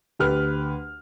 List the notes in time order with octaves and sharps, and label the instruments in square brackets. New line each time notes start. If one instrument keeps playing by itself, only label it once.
[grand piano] D2 G4 B4 F6